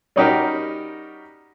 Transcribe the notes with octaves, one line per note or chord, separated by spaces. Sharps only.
G3 C#4 D#4 F#4 G4 A#4